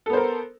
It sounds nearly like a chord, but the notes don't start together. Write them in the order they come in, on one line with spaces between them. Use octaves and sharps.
A4 B3 C5 A#4